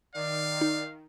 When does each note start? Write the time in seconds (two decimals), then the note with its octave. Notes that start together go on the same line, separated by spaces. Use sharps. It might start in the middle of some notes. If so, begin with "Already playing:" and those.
0.14 D#3 D5 F5
0.61 D#4